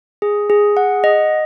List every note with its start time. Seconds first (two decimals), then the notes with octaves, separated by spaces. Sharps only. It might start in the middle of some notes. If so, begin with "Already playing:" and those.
0.22 G#4
0.50 G#4
0.77 F#5
1.04 D#5